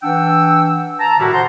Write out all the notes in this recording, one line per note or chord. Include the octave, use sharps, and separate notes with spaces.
E3 D4 F#5 G5 E6
A5 A#5
A2 D3 D#3 G3 E4 F#4
C5 F#5 A5 A#5 C6